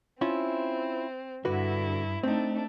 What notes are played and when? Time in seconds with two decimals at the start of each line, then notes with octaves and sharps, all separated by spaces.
0.21 C4 C#4 E4 F4
1.45 G2 D3 E4 F#4 B4
2.23 A3 C4 D4 D#4